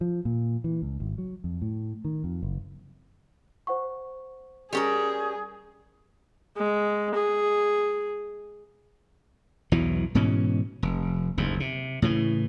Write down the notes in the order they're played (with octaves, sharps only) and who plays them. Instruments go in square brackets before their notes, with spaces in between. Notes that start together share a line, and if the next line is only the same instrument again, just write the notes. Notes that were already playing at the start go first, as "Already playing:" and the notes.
[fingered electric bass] F3
A#2
E3
C#2
G#1
F#3
F2
A2
D#3
F2
F#1
[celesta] C5 F#5 C#6
[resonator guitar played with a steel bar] G3 C#4 A#4 [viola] G#4
[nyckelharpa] G#3
G#4
[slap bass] B1 E2 E3 F#3
G#2 B2 E3 C#4
F1
F#1 D#2 G#2
C3
A2 C#3 E3